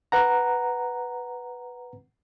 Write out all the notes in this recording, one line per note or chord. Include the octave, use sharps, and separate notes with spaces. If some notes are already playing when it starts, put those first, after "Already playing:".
B4 F#5 A#5